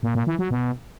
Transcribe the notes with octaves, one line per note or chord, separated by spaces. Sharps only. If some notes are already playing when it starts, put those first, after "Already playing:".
A#2
A#2
E3
F#3
B2